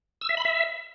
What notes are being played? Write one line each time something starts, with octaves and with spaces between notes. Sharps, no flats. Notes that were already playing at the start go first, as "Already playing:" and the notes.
E6
E5
B5
E5